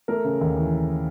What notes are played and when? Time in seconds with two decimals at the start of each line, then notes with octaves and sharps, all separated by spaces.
0.08 A3 A#4
0.24 C#3
0.41 D#2
0.56 E3